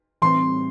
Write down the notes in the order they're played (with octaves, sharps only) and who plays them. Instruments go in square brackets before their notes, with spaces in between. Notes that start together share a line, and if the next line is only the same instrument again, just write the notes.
[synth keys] A2 E3 G3 C4 [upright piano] C6